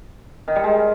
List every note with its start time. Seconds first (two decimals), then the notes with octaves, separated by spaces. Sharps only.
0.48 D#3
0.56 G3
0.64 G#3